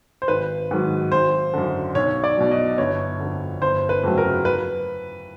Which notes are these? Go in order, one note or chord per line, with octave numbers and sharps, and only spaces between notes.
C5
G#1 B4
G#2 D#3 F#3
G#1 C5
F#2 D3
B1 C#5
D5
B2 F#3
D#5
G1 C#5
F2 D3
G1 C5
B4
F2 C#3 F#3 A3
A#4
B4